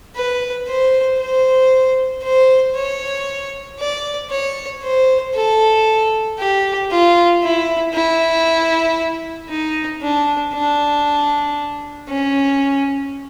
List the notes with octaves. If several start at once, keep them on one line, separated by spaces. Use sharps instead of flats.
B4
C5
C5
C5
C#5
D5
C#5
C5
A4
G4
F4
E4
E4
D#4
D4
D4
C#4